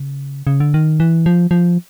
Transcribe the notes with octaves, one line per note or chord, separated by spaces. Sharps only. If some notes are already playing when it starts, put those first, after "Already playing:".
Already playing: C#3
C#3
D3
D#3
E3
F3
F3